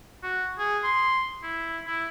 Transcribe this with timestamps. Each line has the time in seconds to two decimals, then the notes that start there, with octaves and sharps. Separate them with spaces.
0.23 F#4
0.58 G#4
0.84 C6
1.43 E4
1.87 E4